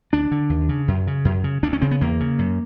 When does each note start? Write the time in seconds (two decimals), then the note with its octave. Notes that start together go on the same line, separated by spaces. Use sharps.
0.13 D2 D4
0.31 D3
0.50 D#2
0.69 C#3
0.88 F#2
1.07 C#3
1.25 F#2
1.44 C#3
1.63 D2 D4
1.73 C#4
1.81 C#3 C4
1.91 B3
2.01 E2 A#3
2.20 C#3
2.39 F#2